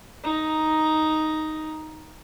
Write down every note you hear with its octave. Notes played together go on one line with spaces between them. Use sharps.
D#4 A#5